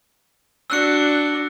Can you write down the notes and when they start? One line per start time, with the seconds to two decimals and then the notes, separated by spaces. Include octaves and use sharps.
0.70 D4 F#4 E6 F#6 C#7